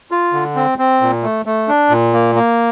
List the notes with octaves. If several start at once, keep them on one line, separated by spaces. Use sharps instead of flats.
F4
D3
C4
C4
A#2
A3
A3
D4
A#2
A#3
A#3